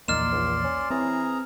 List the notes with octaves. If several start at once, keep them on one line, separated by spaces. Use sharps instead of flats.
A#1 E2 A#3 D#4 D5 C6 F6 E7
C#2
C#4
E3 C4 G#4 A#5